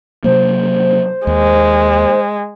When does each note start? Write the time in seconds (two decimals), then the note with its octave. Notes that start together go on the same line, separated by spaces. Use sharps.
0.24 C3 F#3 A#3 C5
1.27 D#2 G#3